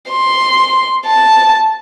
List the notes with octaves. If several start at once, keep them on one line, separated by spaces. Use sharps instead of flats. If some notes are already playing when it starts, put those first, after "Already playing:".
C6
A5